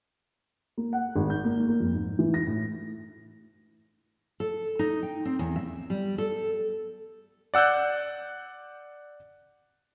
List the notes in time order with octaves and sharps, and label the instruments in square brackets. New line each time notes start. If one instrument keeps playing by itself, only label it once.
[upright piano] A#3
F#5
G#1
G6
A#3
A#3
F2
G#2
E3
A#6
A2
[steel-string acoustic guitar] A4
D#4
G5
C4
E2
E5
G3
A4
[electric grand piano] D5 F#5 E6 F#6 G6